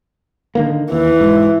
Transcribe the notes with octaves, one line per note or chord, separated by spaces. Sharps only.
D3 D#3 A#3
D#2 E3
G#2